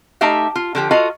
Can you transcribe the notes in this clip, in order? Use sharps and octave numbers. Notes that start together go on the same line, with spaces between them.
A3 D#4 G4 E5 F5
F4
D3 F3 G4
F4 F#4 A4 D#5 F5